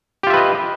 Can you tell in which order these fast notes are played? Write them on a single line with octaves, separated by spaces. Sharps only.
G4 F4 E5 B4 D#5